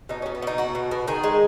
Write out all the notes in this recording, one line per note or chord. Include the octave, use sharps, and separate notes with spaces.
B2 D#4
B2 C#4
B3
B2 D#4
B2 F#4
B2
B2
D#3 G#4
G#3